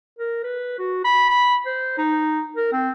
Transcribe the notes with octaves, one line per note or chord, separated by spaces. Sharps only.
A#4
B4
F#4
B5
B5
C5
D#4
A#4
C4